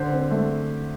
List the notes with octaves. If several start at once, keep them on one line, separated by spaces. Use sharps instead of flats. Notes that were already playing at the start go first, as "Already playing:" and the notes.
Already playing: D3 C5
C4
A3